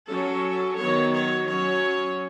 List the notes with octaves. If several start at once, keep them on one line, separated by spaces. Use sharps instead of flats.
F#3 C#4 A4
D#3 F#3 B3 C#5
C#5
F#3 C#4 C#5